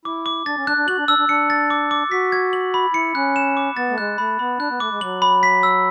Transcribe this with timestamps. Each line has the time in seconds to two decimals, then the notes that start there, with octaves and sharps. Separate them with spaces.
0.05 E4 D6
0.26 D6
0.46 D4 A6
0.57 C#4
0.67 D4 F#6
0.77 D4
0.88 F#4 F#7
0.98 D4
1.08 D4 E6
1.18 D4
1.29 D4 C#7
1.50 A6
1.70 D6
1.91 D6
2.11 F#4 B6
2.32 G#6
2.53 F#7
2.74 B5
2.94 E4 C#7
3.15 C#4 F#6
3.36 E7
3.57 D6
3.77 B3 A6
3.90 A3
3.98 G#3 F#6
4.18 A3 B5
4.39 B3 B5
4.59 D4 F#6
4.70 B3
4.80 A3 D6
4.91 G#3
5.01 F#3 F#7
5.22 B5
5.43 B6
5.63 E6